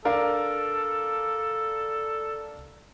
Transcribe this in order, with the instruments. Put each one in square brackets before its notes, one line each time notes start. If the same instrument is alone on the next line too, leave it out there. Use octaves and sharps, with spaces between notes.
[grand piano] D4 A#4 F5 [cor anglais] A4